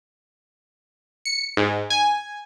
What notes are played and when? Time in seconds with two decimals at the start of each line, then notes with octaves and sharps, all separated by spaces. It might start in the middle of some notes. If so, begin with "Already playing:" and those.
1.25 C#7
1.57 G#2
1.90 G#5